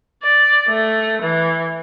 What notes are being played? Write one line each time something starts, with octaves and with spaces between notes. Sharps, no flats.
D5
A3
E3